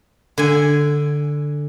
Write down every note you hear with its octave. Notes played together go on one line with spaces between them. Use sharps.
D3 G#5